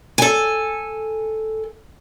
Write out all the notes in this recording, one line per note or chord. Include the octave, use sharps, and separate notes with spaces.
A4 G#5